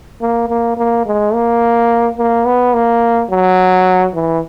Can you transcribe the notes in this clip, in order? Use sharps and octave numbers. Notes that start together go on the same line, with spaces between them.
A#3
A#3
A#3
G#3
A#3
A#3
B3
A#3
F#3
E3